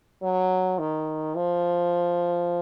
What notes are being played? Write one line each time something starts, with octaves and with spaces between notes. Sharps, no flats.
F#3
D#3
F3